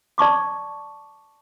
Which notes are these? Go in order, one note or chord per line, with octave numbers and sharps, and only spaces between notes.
D5 A5 C#6 D6